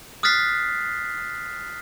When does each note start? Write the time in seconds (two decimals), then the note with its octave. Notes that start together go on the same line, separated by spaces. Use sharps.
0.23 D#6 F6 F#6 A6 B6 C7